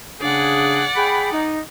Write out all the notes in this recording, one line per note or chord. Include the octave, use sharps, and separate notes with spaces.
C#3 D4 G#4 D5 F#5
G#4 G5 B5
D#4